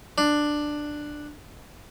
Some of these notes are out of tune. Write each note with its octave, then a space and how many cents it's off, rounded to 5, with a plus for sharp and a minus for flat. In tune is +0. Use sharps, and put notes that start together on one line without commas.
D4 +10